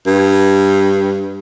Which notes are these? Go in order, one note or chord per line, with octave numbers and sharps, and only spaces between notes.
G2